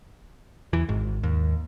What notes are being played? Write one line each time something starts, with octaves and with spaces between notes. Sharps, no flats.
E2 E3
G#1 G#2
D#2